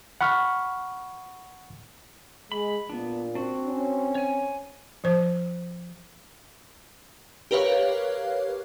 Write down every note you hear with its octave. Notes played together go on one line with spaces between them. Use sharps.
F#5 B5 C#6 F6
G#3 B5
A#2 B3 D4
C4 D4 F#4
C#4
C#5 G#5
F3 C5
G4 A#4 B4 C#5 F5